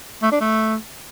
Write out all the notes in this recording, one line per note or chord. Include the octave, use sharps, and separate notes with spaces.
A3
D4
A3